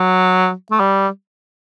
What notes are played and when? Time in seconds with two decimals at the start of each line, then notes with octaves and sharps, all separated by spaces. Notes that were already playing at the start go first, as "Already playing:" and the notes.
Already playing: F#3
0.71 A3
0.80 G3